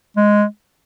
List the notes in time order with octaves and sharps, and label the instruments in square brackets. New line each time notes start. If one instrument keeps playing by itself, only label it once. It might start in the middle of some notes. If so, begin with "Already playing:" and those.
[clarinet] G#3